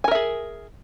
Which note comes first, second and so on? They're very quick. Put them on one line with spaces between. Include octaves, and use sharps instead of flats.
G#5 A#4 E5 G#4